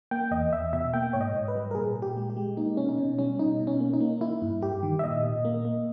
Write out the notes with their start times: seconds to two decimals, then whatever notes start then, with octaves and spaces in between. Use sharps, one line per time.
0.11 A#3 G5
0.31 E2 D#5
0.52 E2 E5
0.73 B2 E5
0.93 A#3 G5
1.13 G#2 C#5
1.21 D#5
1.34 G#2
1.48 B4
1.55 G3
1.71 A#4
1.75 A#2 G#4
1.96 A#2
2.02 G4
2.17 G#3
2.30 G4
2.37 G#3
2.57 A#3 D#4
2.77 B2 C#4
2.89 D#4
2.98 B2 C#4
3.19 G3 C#4
3.39 B2 D#4
3.60 B2
3.67 C#4
3.80 A#3
3.94 D#4
4.01 A#3
4.21 A#3 E4
4.42 G2
4.62 G2 G4
4.83 D#3
4.99 E5
5.03 A#2 D#5
5.24 A#2
5.45 A#3
5.65 A#3